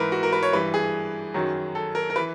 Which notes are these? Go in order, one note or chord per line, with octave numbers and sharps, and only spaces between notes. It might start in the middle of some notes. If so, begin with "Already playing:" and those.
Already playing: G#2 E3 A#4 B4
F#4
A#4
B4
C#5
G2 E3 B4
G#4
F#2 D#3 F#3
A4
A#4
A#4
E3 B4